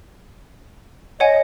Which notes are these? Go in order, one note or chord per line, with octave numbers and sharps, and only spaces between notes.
C#5 D#5 F#5 G#5